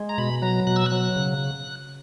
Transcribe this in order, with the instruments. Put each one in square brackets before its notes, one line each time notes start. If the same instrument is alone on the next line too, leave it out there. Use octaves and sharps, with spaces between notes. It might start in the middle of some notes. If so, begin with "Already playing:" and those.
Already playing: [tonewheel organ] G#3
A#5
B2 B5
F#3 A#5
B2 F#6
E6
F#6
F#3
C#3